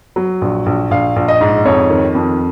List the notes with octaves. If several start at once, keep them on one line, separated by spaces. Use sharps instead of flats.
F#3
A#1
A#1
A#1 F5
A#1
D#5
G#2
F2 C#5
D#3
F2